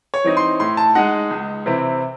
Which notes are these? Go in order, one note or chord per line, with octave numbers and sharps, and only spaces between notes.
C#5
E3 C4 D#4
C6
A2 C6
A5
G#3 D#4 F#5
C#2
C3 E3 C4 E4